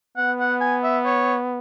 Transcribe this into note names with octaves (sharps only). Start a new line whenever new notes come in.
B3 F#5
F#5
G#5
E5
C#5